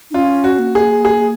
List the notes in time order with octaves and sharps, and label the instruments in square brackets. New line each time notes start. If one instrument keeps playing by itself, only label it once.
[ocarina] D#4
[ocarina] C#4 [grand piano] F4
[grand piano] F#4
[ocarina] A#3
[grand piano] G#4
G#4